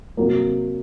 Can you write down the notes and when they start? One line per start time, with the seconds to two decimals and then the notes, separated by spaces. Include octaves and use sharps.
0.17 C3 F#3 A#3